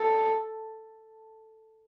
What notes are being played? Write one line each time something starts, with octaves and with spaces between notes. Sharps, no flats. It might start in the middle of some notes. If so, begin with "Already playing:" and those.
Already playing: A4